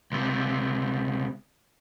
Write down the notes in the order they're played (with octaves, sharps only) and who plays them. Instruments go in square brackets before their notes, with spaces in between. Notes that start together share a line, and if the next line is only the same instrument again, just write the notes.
[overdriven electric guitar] C#2 C3